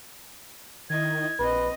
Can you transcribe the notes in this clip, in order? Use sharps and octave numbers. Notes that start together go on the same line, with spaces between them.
D#3 E4 D#5 G#6
A#1 C4 B4 D#5